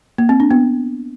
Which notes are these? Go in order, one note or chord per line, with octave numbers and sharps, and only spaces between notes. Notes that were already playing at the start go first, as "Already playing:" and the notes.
A#3
C4
D4
B3